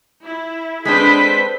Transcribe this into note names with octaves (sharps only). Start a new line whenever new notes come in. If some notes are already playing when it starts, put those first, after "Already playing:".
E4
G#3 C4 D4 A4 B4 C5 B6